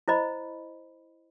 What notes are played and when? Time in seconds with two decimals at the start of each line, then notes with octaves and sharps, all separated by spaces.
0.08 E4 C5 D#5 B5